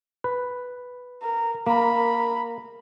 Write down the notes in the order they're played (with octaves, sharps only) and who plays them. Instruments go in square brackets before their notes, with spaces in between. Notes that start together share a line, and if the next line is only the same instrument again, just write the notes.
[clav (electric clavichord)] B4
[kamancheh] A#4
[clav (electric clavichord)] A#3 [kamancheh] A#4 B5